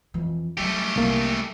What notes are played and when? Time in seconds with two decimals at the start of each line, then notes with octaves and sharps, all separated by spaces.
0.14 F2 E3
0.57 F#3 G3 A3 G4
0.96 C2 A#3